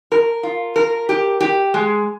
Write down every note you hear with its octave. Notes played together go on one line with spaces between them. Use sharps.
A#4
F4
A#4
G4
G4
G#3